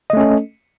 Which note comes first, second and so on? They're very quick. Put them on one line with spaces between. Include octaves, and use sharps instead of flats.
D#5 A3 C#4 A4